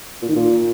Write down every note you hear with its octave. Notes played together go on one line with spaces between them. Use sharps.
A#2
D#3
A#2